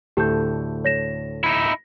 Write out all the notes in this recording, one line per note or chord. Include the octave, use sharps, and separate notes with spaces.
D2 A2 G4 A4 G6
C#5 A#6 E7
D#4 E4